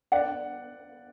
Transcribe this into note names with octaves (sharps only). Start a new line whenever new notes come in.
D5 F#5